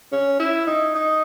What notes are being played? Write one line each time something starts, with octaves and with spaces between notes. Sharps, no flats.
C#4
E4
D#4
D#4